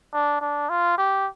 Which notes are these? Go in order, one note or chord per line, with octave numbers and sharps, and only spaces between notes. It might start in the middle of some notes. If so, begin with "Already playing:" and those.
D4
D4
F4
G4